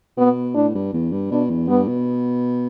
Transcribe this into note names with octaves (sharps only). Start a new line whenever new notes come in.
B2 B3
A2 D4
G2
E2
G2
B2 D4
E2
G2 B3
B2